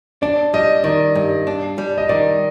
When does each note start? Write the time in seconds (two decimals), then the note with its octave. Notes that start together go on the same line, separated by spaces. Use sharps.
0.22 D4 D5
0.54 G3 D#5
0.84 D#3 D5
1.15 G2
1.47 D4
1.78 G3
1.98 D#5
2.09 D#3 D5